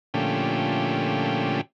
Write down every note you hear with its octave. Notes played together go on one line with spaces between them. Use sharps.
A#2 D3 F3 A3 C#4 G4